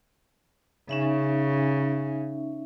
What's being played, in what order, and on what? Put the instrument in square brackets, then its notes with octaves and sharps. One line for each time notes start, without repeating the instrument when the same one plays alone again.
[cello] C#3 [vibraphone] C#4 D#4 E5